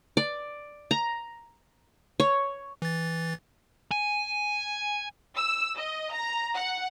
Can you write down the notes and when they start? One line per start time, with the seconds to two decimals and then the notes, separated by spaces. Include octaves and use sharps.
0.17 D5
0.91 A#5
2.20 C#5
2.82 E3 A6
3.91 G#5
5.37 E6
5.78 D#5
6.13 A#5
6.57 F#5